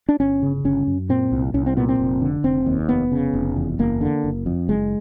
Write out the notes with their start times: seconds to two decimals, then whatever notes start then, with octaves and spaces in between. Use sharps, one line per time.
0.09 D4
0.20 G1 C#4
0.42 C#3
0.64 G1 C#4
0.87 F#2
1.09 A#2 C4
1.32 C2
1.54 C2 C#4
1.66 C4
1.77 A#2 B3
1.88 C4
1.99 F1
2.21 D3
2.44 F1 C4
2.66 D#2
2.89 F1 B3
3.12 C#3
3.33 F1
3.56 E2
3.79 F#1 A#3
4.01 D3
4.24 F#1
4.46 F2
4.69 F#1 G#3